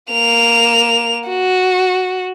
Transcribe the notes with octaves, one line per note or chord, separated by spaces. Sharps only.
A#3 F7
F#4